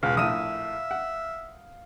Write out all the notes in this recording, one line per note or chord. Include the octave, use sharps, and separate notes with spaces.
E1 C#2 B4 F5
A#1 A2 E5 D#6 D#7
F#5